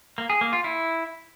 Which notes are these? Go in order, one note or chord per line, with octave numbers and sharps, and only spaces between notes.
A#3
G#4
A#3
F4
E4